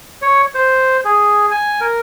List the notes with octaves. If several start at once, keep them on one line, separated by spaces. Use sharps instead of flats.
C#5
C5
G#4
G#5
A#4